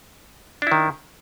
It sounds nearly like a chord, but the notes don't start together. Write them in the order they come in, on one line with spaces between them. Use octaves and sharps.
D4 E4 D#3